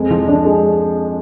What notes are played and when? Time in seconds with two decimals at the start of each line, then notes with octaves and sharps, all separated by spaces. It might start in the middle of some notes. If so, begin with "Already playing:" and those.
Already playing: F2 G#3
0.11 F3
0.28 D4
0.45 G#3